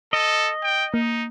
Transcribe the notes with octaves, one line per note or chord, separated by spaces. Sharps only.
A4 D#5
G5
A#3 D#4